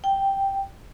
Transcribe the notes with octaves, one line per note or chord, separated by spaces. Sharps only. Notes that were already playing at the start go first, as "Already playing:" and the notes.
G5